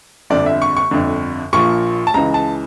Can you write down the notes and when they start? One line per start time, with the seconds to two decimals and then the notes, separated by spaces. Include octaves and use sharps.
0.30 G1 F2 D3 D5
0.46 E5
0.62 C#6
0.77 C#6
0.91 G1 F2 D3
1.53 A#1 A#2 F3 C#6
2.07 A5
2.14 C#2 C#3 E3 A#5
2.34 A5